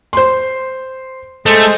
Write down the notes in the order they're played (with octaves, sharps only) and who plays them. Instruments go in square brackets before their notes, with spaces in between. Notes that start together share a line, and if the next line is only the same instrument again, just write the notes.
[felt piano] C5 C6
[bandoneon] G#3 C5 D#5 [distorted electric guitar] A3